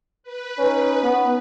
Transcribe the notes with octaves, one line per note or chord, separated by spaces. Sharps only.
B4
C#4 D#4
B3